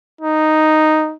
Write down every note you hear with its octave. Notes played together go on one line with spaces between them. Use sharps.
D#4